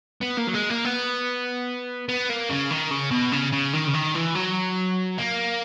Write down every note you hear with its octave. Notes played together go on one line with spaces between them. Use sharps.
B3
A#3
F#3
G#3
A#3
B3
B3
A#3
C#3
D#3
C#3
B2
C#3
C#3
D#3
C#3
D#3
E3
F#3
A#3